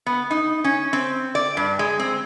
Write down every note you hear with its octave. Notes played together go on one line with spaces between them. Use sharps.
B3
D#4
C#4
C4
D5
G2
G#3
C4